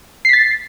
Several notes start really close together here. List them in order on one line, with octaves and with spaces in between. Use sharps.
C7 B6 A6